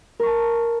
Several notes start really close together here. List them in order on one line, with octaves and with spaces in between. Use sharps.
A#4 C#6 A5